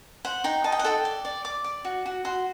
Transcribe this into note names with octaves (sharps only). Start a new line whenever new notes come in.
C5 F#5
D#4 G5
D#5 A5
G5
F#5
A4 G5
D5
D5
D5 D6
D5
F#4
F#4
F#4 C6